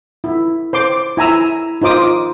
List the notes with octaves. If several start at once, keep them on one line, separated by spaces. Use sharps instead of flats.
E4
C5 C6 D6
E4 G#5 A#5 E6
D#4 F4 C5 D6 D#6